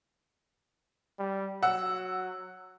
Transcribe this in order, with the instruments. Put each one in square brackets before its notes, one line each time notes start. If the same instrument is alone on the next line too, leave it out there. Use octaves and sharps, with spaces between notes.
[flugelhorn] G3
[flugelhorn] F#3 [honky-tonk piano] F#5 E6